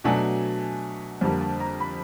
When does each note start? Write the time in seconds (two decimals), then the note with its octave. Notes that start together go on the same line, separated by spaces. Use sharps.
0.04 B2 F#3 A3 D4 G#5
1.21 F2 D3 G3 A#3 A5
1.41 A5
1.60 A#5
1.80 B5